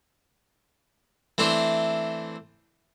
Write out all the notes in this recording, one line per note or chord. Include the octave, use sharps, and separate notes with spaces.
E3 A3 C4 D4 C5